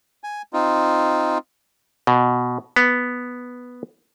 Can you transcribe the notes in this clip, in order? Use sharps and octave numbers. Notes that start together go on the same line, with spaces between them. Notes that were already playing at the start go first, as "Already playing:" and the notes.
G#5
C4 D#4 F4
B2
B3